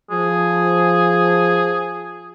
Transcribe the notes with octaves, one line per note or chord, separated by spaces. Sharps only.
F3 G#4